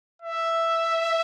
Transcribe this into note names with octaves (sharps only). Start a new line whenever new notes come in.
E5